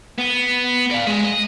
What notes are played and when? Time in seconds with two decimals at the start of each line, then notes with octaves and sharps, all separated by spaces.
0.18 B3
0.91 D5 F5
1.07 G#3
1.24 D#5